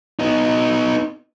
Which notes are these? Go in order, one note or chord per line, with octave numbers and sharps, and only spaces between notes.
B3 D#4